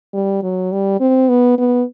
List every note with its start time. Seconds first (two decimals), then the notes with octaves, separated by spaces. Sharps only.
0.14 G3
0.43 F#3
0.72 G3
1.00 C4
1.29 B3
1.58 B3